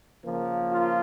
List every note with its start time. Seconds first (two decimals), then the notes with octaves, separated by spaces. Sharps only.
0.25 C#3 F3 A#3
0.71 F4